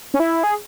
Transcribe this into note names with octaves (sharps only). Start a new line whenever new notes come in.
C#4
E4
G#4